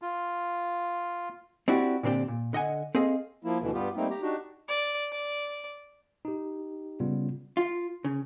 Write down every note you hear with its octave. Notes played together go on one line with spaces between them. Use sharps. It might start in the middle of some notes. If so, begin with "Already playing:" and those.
F4
C4 D4 E4 F#4 G4
A#2 D3 C4 D4 G4
A#2
D3 D#5 F#5 G#5
C4 G#4 A4 D#5 F5
F3 A#3 E4
D2 B2 D3 E3
G2 G3 B3 F4 G4
G3 A3 A#3 C4 D#4
G4 A#5
D4 D#4 F#4 G4
D5
D5
D#4 G4
C#3 G3 B3 C#4 F4
F4
C#3